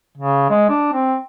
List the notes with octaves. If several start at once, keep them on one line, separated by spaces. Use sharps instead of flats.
C#3
G#3
D4
C4